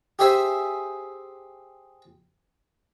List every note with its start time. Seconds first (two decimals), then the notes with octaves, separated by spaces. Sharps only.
0.19 G4 G#4 C5 E5 G#5